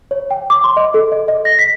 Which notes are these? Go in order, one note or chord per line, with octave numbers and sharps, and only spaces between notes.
C#5
G5
D6
C6
D#5
A4
D#5
D#5
A#6
B6